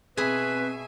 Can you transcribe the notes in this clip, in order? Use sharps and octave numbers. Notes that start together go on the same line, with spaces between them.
B2 C4 G#4 B4 E5 G#5 B5